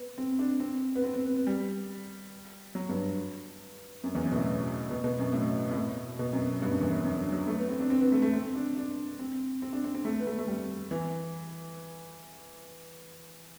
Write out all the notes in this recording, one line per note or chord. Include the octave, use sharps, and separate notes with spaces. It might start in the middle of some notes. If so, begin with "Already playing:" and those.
Already playing: B3
C4
D4
C4
B3
C4
C4
B3
B3
G3
F#3
G2
F#2
E2
F#2
B2
A2
B2
B2
F#2
A2
A2
B2
B2
F#2
G2
F#2
E2
F#2
F#2
D3
F#3
A3
B3
C4
D4
C4
B3
A3
A3
C4
D4
D4
C4
C4
D4
C4
C4
A3
B3
A3
A3
G3
E3